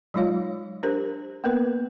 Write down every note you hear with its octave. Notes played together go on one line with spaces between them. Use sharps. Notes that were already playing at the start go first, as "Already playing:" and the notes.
F#3 G#3 D#4 F4 C#5 F5
D4 G4 A#4 C5
A#3 B3 A#4 B4